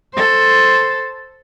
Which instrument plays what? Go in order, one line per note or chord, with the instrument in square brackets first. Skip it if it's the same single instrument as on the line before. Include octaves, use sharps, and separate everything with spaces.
[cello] A4 C5